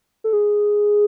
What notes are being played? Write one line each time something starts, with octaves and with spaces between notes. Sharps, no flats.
A4
G#4